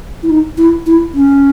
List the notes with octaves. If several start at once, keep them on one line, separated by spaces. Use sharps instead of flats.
E4
D#4
E4
E4
C#4